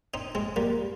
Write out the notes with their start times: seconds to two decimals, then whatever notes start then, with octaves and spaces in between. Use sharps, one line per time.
0.14 C4 D#4
0.35 G#3 C4
0.56 G3 A#3